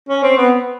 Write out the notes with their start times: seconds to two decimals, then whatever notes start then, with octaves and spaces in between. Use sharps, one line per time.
0.09 C#4
0.23 C4
0.37 B3